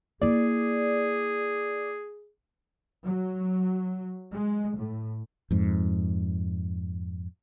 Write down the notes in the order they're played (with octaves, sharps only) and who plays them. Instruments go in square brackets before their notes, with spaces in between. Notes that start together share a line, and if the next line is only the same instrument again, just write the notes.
[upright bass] A#3 E4 [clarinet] G#4 [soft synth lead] D5
[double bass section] F#3
G#3
A2
[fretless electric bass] F2 G#2